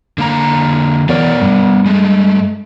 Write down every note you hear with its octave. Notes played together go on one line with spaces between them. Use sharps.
D3 A#3 A#5
E2 B3 A#4 C#5 D5
G2
G#3 A3